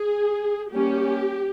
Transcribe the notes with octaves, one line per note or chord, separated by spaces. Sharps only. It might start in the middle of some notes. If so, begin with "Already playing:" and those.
Already playing: G#4
G3 A#3 C#4 G4